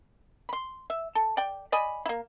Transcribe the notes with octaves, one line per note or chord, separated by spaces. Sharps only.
B5 C6
E5
A4
D5 G5
D5 D#5 G#5 B5
A#3 E4